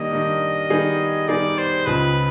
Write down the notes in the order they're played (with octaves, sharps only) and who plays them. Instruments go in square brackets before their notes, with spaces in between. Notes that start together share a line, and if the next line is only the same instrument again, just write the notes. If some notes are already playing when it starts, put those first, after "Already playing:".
Already playing: [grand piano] D#3 G3 A#3 D4 [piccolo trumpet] D#5
[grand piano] D#3 G3 A#3 D4
D#3 G3 B3 D#4 G#4
[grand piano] D#3 G3 B3 D#4 G#4 [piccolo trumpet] D5
[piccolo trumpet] C5
[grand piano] C#2 C#3 F3 [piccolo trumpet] B4